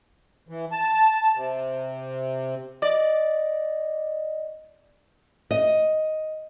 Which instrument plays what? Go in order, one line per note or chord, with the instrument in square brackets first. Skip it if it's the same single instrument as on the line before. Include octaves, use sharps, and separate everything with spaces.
[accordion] E3
A5
C3
[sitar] D5 [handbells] D#5
[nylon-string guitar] D#5